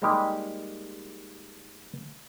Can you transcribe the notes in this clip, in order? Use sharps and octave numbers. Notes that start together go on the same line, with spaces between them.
G3 G#3 A#3 D#4 G4